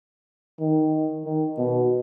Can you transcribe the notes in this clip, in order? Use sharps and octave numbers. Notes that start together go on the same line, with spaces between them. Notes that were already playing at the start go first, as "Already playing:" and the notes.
D#3
D#3
B2